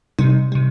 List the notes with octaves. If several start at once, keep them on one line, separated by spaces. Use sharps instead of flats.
C3 G3 D#4
C3 G3